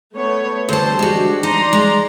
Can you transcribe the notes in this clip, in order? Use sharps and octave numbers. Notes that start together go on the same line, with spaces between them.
A3 B3 C#5
D2 G3 A4 C5 A5
G#3 D4 F#4 G4
D#4 D5 A#5 C6
G#3